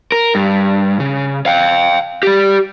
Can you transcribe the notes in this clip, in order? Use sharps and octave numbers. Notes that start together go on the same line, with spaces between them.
A#4
G2
C#3
F5 G5
G4 D5